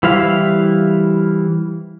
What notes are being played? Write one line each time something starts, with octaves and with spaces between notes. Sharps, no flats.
E3 G3 E4 C5 F5